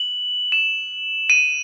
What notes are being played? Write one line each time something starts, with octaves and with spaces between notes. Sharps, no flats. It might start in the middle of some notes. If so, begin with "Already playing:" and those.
Already playing: F#7
E7
D#7